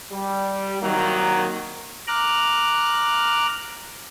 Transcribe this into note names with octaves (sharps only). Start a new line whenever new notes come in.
G3
C2 D#3 F#3 A#3
A#5 D6 F6 F#6